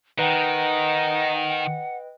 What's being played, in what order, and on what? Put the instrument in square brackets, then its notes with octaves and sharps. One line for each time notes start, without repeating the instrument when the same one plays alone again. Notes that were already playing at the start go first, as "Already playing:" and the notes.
[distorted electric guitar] D#3 [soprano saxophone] D#4 [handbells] B4 D#5 G5 [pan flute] F#5